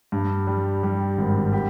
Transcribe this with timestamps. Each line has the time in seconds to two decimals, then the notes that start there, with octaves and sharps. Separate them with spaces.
0.12 G2
0.47 G3
0.83 G3
1.18 G#1
1.53 G4